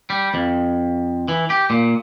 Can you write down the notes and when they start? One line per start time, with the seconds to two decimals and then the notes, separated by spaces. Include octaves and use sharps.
0.10 G3
0.34 F2
1.28 E3
1.50 G4
1.70 A#2